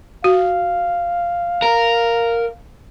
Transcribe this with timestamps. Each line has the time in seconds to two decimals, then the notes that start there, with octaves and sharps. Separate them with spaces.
0.24 F#4 F5
1.62 A#4